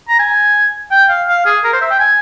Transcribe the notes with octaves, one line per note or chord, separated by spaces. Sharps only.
A#5
G#5
G5
F5
F5
G#4
A#4
C5
E5
G5
G#5